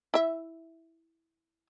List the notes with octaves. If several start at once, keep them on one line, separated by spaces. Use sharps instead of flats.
E4 E5